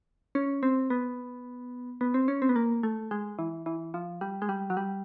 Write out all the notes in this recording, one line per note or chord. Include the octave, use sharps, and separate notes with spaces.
C#4
C4
B3
B3
C4
C#4
C4
B3
A#3
A3
G#3
E3
E3
F3
G3
G#3
G3
F#3
G3